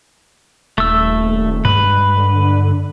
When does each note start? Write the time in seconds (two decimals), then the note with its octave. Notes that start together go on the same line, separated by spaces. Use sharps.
0.78 D#1 A3 E6
1.65 G2 G#3 B4
2.17 D3